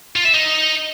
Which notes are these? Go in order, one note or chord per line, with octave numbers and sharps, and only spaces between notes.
F4
E5
D#4